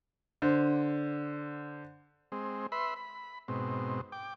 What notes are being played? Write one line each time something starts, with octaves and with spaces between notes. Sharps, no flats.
D3 C5
G#3 C4
B4 E5 B5 C6
B5
G#2 B2 C4
G5 D6